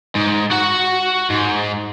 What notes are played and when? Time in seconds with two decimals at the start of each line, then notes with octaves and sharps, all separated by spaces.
0.16 G#2
0.51 F#4 F#5
1.30 G#2